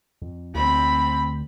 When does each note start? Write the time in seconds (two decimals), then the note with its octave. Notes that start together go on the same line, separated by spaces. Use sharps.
0.22 F2
0.54 D2 C4 B5